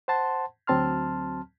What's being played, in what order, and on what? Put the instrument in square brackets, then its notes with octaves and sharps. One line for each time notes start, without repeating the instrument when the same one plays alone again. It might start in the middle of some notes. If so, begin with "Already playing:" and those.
[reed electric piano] C5 F#5 A5 C6
D2 F#3 C4 A5 C6 F6